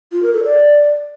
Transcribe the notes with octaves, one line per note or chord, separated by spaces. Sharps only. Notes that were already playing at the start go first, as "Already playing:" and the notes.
F4
A#4
A4
D5